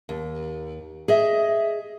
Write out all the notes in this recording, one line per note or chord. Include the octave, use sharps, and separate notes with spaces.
D#2
G#4 D#5 E5